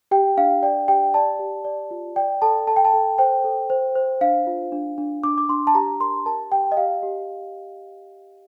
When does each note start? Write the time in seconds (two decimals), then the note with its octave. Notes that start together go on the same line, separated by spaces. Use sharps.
0.11 G4 G5
0.37 D4 F5
0.63 D5 G5
0.88 G4 G5
1.14 D5 A5
1.39 G4
1.65 D5
1.91 F4
2.16 D5 G5
2.42 A4 A5
2.67 A4 A5
2.76 G5
2.85 A5
2.93 A4
3.18 C5 G5
3.44 A4
3.70 C5
3.95 C5
4.21 D4 F5
4.47 F4
4.72 D4
4.98 D4
5.23 D4 D6
5.38 D6
5.49 D4 C6
5.67 A5
5.75 G4 A#5
6.00 A#4 C6
6.26 A#4 A5
6.52 G4 G5
6.72 D#5
6.77 G4 F5
7.03 G4